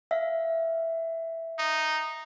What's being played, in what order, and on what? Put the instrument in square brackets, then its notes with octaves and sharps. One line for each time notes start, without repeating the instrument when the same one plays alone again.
[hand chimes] E5 F5
[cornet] D#4